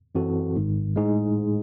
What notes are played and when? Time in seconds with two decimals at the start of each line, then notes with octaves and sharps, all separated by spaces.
0.15 F#2 E3 C4 F#4 A4
0.56 G#1 G#2 D#3
0.96 A2 G#3 D#4 G#4